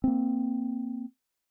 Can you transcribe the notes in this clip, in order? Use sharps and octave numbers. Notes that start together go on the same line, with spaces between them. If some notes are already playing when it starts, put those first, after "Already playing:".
A#3 C4